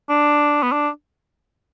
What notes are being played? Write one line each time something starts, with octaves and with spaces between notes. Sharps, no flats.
D4
B3
D4